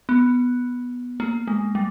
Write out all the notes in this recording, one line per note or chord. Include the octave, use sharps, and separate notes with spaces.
B3
A#3
G#3
G3